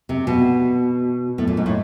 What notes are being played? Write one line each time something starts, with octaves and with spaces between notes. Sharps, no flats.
C3
B2
A2
A#2
G#2
A2